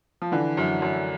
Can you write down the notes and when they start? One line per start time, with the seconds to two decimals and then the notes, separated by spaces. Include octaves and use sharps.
0.22 F3
0.32 D3 E3
0.57 F#2
0.82 F#2